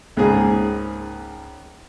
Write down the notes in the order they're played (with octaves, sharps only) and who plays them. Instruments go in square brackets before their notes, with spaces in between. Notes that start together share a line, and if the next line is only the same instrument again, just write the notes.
[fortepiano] C#2 G#2 A#3 G#4